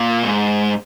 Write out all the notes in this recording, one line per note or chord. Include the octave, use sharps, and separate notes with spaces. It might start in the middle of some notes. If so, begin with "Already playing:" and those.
Already playing: A#2
G#2